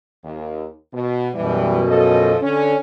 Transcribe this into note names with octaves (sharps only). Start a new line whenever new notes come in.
D#2
B2
F#2 B2 E3 G3
F3 A4 D#5
D3 C#4